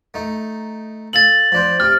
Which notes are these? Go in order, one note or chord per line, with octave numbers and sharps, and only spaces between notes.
A3 D#4
A4 F5 A6 F#7
F3 D4 C5
C3 G4 F6